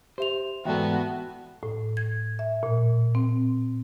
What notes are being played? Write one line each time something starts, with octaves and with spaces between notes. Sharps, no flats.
G4 C5 E5 F7
E2 G#2 B3 F#4 A4 D5 E5 G5
A2
G#6
E5
A#2
C4